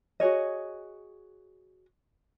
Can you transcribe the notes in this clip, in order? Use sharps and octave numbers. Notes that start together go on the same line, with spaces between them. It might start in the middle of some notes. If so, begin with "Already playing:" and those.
F#4 G#4 C#5 D#5